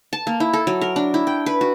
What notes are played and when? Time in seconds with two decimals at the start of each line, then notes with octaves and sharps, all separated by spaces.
0.13 A5
0.27 A#3
0.40 E4
0.54 A4
0.67 F#3
0.81 A#4
0.96 D4
1.14 E4
1.27 G5
1.46 B4
1.61 F#4